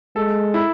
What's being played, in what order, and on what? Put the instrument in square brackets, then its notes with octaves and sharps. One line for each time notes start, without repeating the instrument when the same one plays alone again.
[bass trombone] G#3 [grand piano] A4
[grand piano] E4